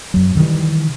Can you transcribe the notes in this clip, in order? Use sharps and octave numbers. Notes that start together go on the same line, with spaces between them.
F#2 F#3
C3 D#3 E3 G3